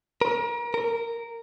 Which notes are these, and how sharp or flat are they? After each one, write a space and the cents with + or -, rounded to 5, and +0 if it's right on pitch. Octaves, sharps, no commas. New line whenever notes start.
A#4 +35
A#4 -10